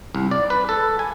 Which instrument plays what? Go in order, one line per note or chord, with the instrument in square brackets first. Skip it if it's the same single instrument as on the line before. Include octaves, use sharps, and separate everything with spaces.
[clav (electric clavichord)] C2
D5
B4
A4
G#5